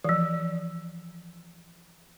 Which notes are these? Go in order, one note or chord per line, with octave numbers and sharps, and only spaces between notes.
E3 F3